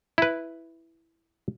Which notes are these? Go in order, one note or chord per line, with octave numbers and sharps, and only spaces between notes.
E4 B4